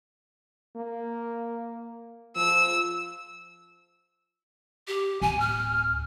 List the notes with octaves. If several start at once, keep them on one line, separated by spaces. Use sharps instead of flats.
A#3
F3 E6
G4
D1 G#5
F6